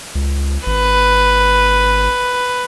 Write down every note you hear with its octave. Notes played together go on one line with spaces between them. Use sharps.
C#2
G#1 B4